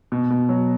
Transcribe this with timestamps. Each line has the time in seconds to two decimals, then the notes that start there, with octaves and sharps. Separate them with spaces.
0.12 B2
0.30 B2
0.49 F#3